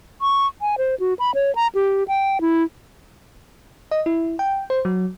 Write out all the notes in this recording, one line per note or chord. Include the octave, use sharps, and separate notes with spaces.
C#6
G#5
C5
F#4
B5
C#5
A#5
G4
G5
E4
D#5
E4
G5
C5
F#3